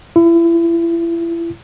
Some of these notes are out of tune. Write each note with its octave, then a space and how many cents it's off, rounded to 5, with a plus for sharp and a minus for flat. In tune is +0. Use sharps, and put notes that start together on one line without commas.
E4 +30